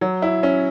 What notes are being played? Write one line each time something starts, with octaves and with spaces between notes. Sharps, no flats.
F#3
E4
C#4